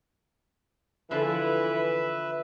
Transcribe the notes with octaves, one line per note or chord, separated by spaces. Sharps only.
D3 E3 F3 B4 E5